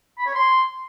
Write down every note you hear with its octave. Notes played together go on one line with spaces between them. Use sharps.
B5
C#5
C6